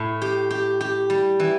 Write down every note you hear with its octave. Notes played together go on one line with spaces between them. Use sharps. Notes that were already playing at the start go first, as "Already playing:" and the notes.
Already playing: A2
G4
G4
G4
G3
E3